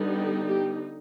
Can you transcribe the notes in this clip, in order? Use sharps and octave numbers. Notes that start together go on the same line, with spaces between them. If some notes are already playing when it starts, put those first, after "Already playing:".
Already playing: D3 G3 B3 D#4
G4
G4